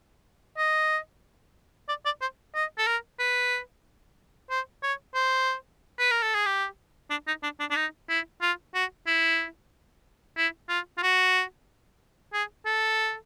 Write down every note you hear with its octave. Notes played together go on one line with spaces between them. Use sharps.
D#5
D5
D5
C5
D#5
A4
A#4
B4
C5
C#5
C5
B4
A#4
A4
G#4
G4
D4
D#4
D4
D4
D4
D#4
E4
F4
F#4
E4
E4
F4
F4
F#4
G#4
A4